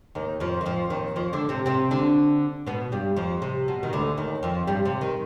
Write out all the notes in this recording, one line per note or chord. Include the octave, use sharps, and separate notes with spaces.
D#2 D#3
F2 F3
D#3
F2 F3
D#2 D#3
F2 F3
D3 D4
C3 C4
C3 C4
D3 D4
B2 B3
G2 G3
F2 F3
C3
B2
D#3
D2 D3
D#2 D#3
F2 F3
G2 G3
C3
D#3